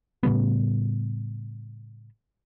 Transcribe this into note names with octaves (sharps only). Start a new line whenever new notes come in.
A2 C#3 G3 B3